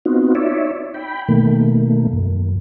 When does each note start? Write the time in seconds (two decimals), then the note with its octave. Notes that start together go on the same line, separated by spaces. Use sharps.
0.05 B3 C4 D#4 F4 F#4
0.35 D#4 C#5 D5 E5
0.94 G5 B5
1.29 B2 D#3 A3 A#3
2.13 F#2